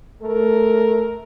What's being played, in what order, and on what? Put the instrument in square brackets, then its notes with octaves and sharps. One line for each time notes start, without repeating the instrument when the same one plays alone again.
[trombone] A3 [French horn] A#4